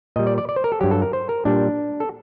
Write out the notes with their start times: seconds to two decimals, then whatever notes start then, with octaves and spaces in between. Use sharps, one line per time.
0.16 A#2 G3 D#5
0.27 D5
0.38 D5
0.49 D5
0.56 C5
0.64 A#4
0.72 A4
0.81 G2 F#3 G4
0.91 A4
1.02 A#4
1.13 C5
1.29 A#4
1.45 A#2 G3 D4
2.00 A4